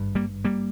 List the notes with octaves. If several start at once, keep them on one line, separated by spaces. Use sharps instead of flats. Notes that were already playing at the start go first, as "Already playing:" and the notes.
Already playing: G#1 G2
G3 A#3
G3 A#3